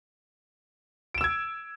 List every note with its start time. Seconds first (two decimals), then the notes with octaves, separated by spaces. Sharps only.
1.14 D7
1.18 E7
1.21 E6
1.24 G#6